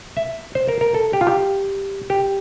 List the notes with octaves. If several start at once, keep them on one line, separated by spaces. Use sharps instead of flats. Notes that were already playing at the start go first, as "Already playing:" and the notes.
E5
C5
A#4
A#4
A4
G4
F4
G4
G4